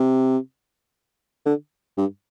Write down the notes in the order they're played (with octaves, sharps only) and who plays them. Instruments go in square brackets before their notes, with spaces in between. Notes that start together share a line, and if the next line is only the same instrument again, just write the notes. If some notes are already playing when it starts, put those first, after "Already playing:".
Already playing: [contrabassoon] C3
D3
G2